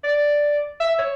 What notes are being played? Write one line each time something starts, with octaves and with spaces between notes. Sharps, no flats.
D5
E5
C#5